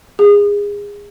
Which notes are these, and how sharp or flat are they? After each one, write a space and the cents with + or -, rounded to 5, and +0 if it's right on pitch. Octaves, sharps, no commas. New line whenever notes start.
G#4 -25